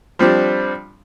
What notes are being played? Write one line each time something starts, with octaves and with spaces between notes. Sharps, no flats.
F3 G3 C4 D4